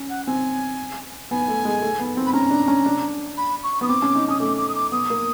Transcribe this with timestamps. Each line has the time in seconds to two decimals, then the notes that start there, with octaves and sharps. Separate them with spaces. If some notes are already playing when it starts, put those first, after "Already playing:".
Already playing: C#4
0.10 F#5
0.27 C4 G#5
1.31 B3 G#5
1.48 A3
1.65 G#3
1.82 A3
2.00 B3
2.17 C4
2.27 B5
2.33 C#4 A#5
2.51 D4
2.68 C#4
2.86 D4
3.37 B5
3.64 C#6
3.81 B3 D#6
3.88 C4 D6
4.02 C#4
4.15 D#4
4.28 C#4 D#6
4.40 A3 D6
4.57 D6
4.69 D#6
4.75 D6
4.92 B3 D#6
5.10 A#3